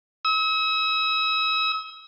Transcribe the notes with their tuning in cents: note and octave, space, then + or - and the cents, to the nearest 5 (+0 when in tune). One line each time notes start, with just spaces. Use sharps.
E6 -45